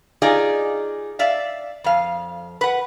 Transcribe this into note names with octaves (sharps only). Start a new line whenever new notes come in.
D#4 F4 G4 G#4 D5 D#5
D5 E5 F5
F2 F5
B4 F#5